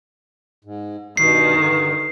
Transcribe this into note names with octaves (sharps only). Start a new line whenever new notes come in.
G#2
G2 B2 D#3 C7
G2 D3